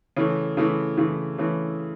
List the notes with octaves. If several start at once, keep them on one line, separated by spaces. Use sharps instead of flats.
C#3 E3 A3
C#3 E3 A3
C#3 E3 A3
C#3 E3 A3